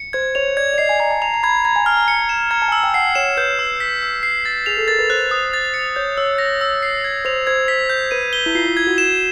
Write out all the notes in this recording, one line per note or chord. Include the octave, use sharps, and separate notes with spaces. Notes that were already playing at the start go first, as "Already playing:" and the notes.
Already playing: C#7
C5 G#6
C#5 F7
D5 G#6
D5
D#5 C7
G#5
A#5 G#6
A5
A#5 F7
A#5
B5 G#6
A#5 G#6
G#5
A5 F6
A#5
C#7
E7
A#5 G#6
A5
G#5
A5 E6
G5
F#5 C7
C#5 E7
B4 G6
E6
B6
E6
C7
A6
G#4 F7
A4
A#4 A6
B4
C5 F#6
D#6
A6
C#7
C#5 G6
C#5 E6
A#6
E6
C7
G#6
C5 F7
C5 G#6
B6
G6
B4 D#7
G7
E4
F4 C7
E4
G#6
F#4
E7